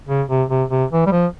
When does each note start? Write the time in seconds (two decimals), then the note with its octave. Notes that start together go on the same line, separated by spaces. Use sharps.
0.08 C#3
0.29 C3
0.49 C3
0.70 C3
0.91 E3
1.07 G3
1.12 F3